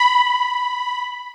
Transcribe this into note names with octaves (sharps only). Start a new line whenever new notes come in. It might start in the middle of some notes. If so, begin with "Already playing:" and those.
Already playing: B5